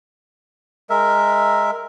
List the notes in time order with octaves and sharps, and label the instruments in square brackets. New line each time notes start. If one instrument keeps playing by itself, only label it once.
[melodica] G#3 A#4 E5